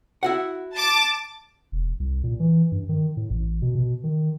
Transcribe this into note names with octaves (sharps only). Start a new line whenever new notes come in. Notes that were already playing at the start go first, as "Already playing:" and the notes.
E4 F#4 F#5
A5 D6
E1
C2
A#2
E3
G2
D#3
A2
A1
B2
B2
D#3